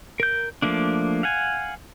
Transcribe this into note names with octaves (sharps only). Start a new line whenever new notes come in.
A#4 G6
F3 A3 A#3 D4
F5 F#5 G#5